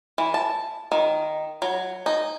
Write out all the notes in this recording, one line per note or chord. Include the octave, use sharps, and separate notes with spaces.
E3
A5
D#3
F#3
D#4